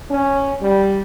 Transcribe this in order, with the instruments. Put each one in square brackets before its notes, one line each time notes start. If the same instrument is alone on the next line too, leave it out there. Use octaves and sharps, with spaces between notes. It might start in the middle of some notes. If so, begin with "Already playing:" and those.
[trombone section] C#4
G3